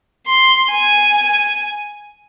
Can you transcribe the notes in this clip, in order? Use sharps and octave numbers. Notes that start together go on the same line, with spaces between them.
C6
G#5